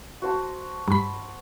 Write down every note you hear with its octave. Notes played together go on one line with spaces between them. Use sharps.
F#4 C5 A5
G2 B5